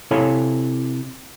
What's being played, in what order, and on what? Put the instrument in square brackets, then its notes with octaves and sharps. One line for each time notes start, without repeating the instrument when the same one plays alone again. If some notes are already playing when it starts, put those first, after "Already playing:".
[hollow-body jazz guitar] C3 E4 A4 C#5 F5 G#5